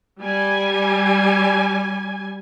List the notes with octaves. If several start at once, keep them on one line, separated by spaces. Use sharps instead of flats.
G3 G#5